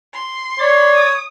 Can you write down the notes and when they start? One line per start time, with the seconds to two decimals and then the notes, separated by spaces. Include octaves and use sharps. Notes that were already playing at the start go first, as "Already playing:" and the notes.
0.13 C6
0.59 C#5 D5 D6
0.95 D#6